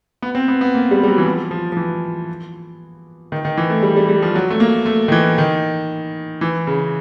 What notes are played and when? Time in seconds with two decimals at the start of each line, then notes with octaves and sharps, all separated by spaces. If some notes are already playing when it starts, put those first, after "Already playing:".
0.22 B3
0.35 C4
0.48 B3
0.61 B3
0.75 A#3
0.91 G3
1.03 G3
1.08 F#3
1.18 E3
1.26 F3
1.51 F3
1.72 F3
1.77 E3
3.32 D#3
3.45 D#3
3.57 E3
3.70 A3
3.83 G3
3.97 G3
4.09 G3
4.22 F3
4.35 F#3
4.50 A3
4.60 A#3
4.86 A3
5.08 D#3
5.12 E3
5.38 D#3
6.41 E3
6.67 C#3